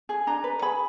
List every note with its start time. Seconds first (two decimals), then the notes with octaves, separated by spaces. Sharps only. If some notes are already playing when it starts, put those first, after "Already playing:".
0.09 G#4
0.27 D4 A#5
0.44 B4
0.62 G#4 B5